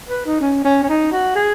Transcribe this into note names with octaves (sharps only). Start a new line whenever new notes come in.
B4
D#4
C#4
C#4
C#4
D#4
F#4
G#4